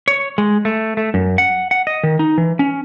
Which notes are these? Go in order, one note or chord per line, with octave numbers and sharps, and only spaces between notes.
C#5
G#3
A3
A3
F#2
F#5
F#5
D#5
D#3
D#4
E3
C#4